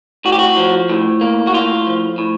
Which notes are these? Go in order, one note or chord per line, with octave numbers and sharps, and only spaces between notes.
A2 F#4
G4
F#4
F3
A2
A#3
F#4
A2 F4
F3
A2